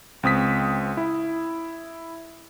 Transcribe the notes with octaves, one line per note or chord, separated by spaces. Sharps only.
C#2 C4 D#6 B6
E4